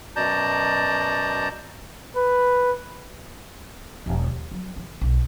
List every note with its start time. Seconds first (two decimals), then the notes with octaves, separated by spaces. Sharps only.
0.16 F#2 B2 D5 A5 A#5 G6
2.16 B4
4.06 E1
4.27 D#2
4.51 F#3
4.76 D#3
5.01 B1